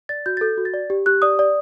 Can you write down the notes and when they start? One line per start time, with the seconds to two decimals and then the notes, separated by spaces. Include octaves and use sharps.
0.09 D5 A6
0.26 F#4 G6
0.37 A6
0.41 A4 G6
0.57 F#4
0.65 A6
0.74 D5
0.90 G4
1.06 G4 F#6
1.22 D5 D#6
1.39 D5